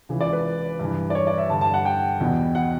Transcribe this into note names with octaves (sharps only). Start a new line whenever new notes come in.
C#2 C#3 E3
D5
B4
G2 E3
D5
C#5
D5
E5
G2 D3 A5
A5
F#5
G5
E2 B2
F#5